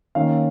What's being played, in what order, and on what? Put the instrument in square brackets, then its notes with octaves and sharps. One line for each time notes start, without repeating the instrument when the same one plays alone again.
[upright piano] D#3 A#3 C#4 F5